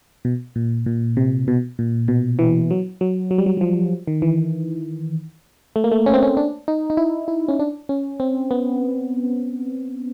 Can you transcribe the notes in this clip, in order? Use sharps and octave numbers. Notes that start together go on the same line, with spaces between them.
B2
A#2
A#2
C3
B2
A#2
B2
E3
F#3
F#3
F#3
G3
F#3
F#3
F3
D#3
E3
A3
A#3
A3
C#4
C4
C#4
D4
D#4
D#4
E4
E4
C#4
D4
C#4
C4
B3